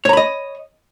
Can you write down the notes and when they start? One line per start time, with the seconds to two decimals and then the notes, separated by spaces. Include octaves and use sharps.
0.05 C#5
0.09 A#5
0.13 B5
0.17 D#5